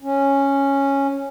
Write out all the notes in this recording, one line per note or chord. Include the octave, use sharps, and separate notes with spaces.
C#4